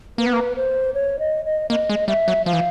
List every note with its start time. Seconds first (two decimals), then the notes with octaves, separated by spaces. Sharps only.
0.18 A#3 B4
0.26 B3
0.33 A#3
0.56 C5
0.94 C#5
1.19 D#5
1.45 D#5
1.70 A#3 D#5
1.90 G#3
2.08 G3 E5
2.28 F#3
2.46 F3 F5
2.53 E3